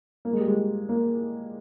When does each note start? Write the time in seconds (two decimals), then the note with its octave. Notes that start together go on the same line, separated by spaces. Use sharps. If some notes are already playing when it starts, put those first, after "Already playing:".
0.25 A#3
0.33 G#3
0.40 G3
0.48 G#3
0.89 A#3